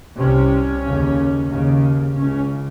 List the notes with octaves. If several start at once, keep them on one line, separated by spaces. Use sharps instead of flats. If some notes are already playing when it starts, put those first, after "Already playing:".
C2 C3 C#4
D#2 C#3
D#2 C#3
C#2 C#3 C#4